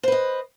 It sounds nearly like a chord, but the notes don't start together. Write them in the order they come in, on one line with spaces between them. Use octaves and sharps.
C5 B4 D#5